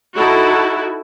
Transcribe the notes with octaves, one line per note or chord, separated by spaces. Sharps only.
D#4 E4 F#4 A4